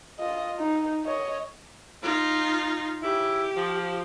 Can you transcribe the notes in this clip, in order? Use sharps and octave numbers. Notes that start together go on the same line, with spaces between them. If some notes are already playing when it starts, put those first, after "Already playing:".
F4 D#5
D#4
C#5 D#5
D#4 F4
C#3 E4 G4
F3